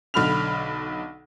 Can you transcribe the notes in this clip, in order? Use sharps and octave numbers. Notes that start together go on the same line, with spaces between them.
B1 D3 B5 F6 F7